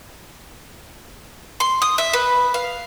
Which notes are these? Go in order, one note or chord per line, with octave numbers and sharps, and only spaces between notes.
C6
D#6
E5
B4
F5